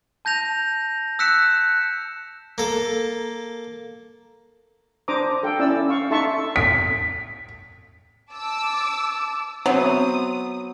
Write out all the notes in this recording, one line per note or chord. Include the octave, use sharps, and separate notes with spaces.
A5 G6 A#6 F7
E6 F#6 B6 C#7 E7
A#3 A4
D4 C5 A#5 D6 D#6
A4 F5 G5
C#4 E4 D5 E6
F5 C#6
D#4 A4 E5 A5 C6 C#6
B6
A5 D6 E6
F#3 B3 C4 E5 D#6